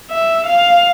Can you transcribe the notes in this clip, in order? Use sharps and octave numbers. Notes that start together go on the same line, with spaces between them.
E5
F5